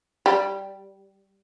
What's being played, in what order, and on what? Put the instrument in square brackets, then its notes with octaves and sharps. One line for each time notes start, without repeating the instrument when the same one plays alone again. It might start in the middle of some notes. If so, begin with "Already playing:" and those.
[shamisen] G3